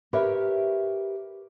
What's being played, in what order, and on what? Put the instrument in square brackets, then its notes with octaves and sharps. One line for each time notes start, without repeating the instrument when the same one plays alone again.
[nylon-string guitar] G4 A#4 B4 C#5 E5